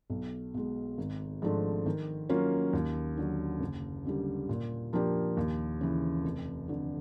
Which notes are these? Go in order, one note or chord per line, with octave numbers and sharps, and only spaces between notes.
B1
B2 G#3
G#1
G#2 F3 A3 D4
D#3
F#3 A#3 C#4 F4
D#2
D3 F#3
F#1
F#2 D3 G3
A#2
F3 A#3 D4 G4
D#2
C#3 E3
F1
F2 D3